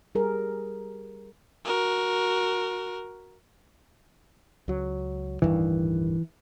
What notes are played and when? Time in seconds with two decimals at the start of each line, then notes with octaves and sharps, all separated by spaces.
0.15 G3 G#4 A#4
1.65 F#4 A#4
4.68 C#2 F#3
5.42 D1 G2 D#3 E3